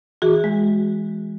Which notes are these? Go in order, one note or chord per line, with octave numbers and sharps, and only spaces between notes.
E3 F#4 G#4
G#3